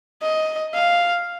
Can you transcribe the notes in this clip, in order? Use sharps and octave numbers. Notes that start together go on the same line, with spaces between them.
D#5
F5